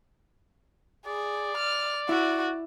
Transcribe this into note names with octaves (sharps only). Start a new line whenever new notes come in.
G#4 D5
F6
E4 F#4